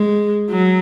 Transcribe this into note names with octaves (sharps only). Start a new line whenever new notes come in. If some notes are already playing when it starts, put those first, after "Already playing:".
Already playing: G#3
F#3